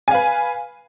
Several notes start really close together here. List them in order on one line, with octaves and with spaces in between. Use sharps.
G#5 F5 B4